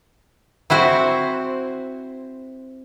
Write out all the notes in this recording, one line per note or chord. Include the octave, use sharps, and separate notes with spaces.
C4 E4 F#4 C5